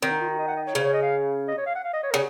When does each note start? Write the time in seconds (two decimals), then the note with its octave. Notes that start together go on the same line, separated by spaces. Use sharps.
0.03 D#3 C4
0.11 D#4
0.21 F4
0.30 F#4
0.39 D#5
0.48 F#5
0.57 D#5
0.67 C#5
0.75 C#3 C5
0.84 C#5
0.93 D#5
1.02 F5
1.48 D#5
1.58 C#5
1.66 F5
1.75 F#5
1.84 F5
1.93 D#5
2.03 C#5
2.11 A#4
2.14 C#3